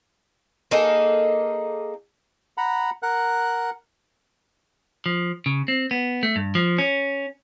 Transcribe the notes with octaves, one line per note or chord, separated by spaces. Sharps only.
A#3 D#4 G#4 A4
F#5 A#5 B5
A#4 F#5 F#6
F3
C#3
C4
B3
A3
G2
F3
C#4